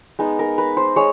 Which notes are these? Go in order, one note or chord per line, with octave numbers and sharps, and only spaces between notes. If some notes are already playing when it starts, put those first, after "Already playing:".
G#3 B3 D#4
A#4
B4
C5
G#3 C#5